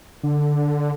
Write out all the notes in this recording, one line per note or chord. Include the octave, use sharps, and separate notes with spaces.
D3